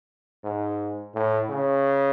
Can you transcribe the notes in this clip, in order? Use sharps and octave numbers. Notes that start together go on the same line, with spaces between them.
G#2
A2
C#3